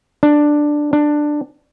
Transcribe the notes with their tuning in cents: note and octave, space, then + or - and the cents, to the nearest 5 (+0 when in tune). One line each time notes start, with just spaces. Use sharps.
D4 +5
D4 +10